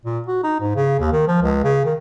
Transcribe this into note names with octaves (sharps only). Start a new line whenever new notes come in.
A#2
F#4
D#4
G#2
C#3
D#2
D#3
F3
C#2
C#3
D#3